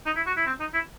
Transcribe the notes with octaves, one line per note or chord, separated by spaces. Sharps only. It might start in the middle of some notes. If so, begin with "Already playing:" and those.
D#4
E4
F#4
E4
C4
D#4
E4